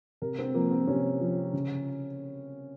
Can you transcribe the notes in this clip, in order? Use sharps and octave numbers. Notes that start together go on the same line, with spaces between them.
C3 A#4
C4
F3 A#3
C4
C3 C#4
F3
C#3